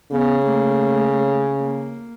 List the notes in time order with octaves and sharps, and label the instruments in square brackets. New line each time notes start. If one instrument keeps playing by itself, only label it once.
[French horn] C#3 [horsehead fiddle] B3
[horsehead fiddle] A3 A#3
A#3